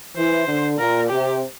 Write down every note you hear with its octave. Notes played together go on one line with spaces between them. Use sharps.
E3 C5
D3
A#2 A#4
C3 G4